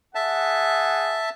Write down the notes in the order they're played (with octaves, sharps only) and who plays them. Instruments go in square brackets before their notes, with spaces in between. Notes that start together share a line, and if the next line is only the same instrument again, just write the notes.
[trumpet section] G#4 F#5 [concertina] E5 A5